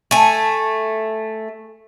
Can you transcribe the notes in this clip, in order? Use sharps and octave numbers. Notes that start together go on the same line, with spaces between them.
A3 G#5